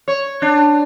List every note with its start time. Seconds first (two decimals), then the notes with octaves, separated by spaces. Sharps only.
0.08 C#5
0.42 D4